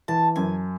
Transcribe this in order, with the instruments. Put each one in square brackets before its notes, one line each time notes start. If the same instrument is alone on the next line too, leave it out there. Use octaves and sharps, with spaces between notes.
[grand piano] E3 [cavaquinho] A5
[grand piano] F#2 [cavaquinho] G#5